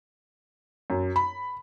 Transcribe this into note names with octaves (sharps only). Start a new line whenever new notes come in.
F#2
B5